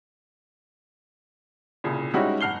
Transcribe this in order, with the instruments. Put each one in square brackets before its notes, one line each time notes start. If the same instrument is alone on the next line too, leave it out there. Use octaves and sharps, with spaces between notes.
[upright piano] C2 A#2 C#3
G3 G#3 C#4 D#4 E4 F#4
F#1 F#5 F6 C7 G7